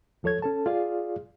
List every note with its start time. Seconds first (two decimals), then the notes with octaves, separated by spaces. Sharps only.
0.23 D#2 F3 A4 C#5 G#6
0.42 C#4 A4 A5
0.66 F4 G#4 D5 F5